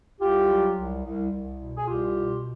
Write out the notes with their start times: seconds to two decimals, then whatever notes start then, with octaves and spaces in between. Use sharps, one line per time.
0.21 C2 F4 G4
0.49 F#3
0.77 C2
1.05 C2
1.31 C2
1.59 B2
1.77 G#4
1.87 C2 F4 G4
2.14 B2